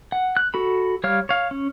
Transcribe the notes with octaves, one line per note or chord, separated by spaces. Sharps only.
F#5
F#6
F#4 A4 B5
G3 C#5 F5 F6
C#5 F5
C#4